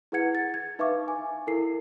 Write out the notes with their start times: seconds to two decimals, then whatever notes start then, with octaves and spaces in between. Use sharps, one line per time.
0.12 E4 G#4 B4 F#5 G#6 C#7
0.35 A6
0.54 G#6
0.79 D#4 B4 E5 F5 C#6 D6
1.08 G#5
1.47 E4 A4 A#4 C7